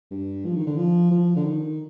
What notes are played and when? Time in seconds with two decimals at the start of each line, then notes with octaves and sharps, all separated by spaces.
0.11 G2
0.45 F3
0.56 D#3
0.67 D3
0.77 F3
1.11 F3
1.36 D3
1.44 D#3